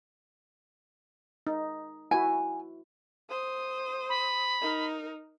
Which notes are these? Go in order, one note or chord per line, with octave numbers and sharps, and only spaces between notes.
D#4
E4 F#4 G#5
C5 D#6
B5
D#4 A#4